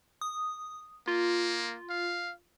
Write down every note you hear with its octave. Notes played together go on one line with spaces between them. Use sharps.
D#6
A#3 F4
F5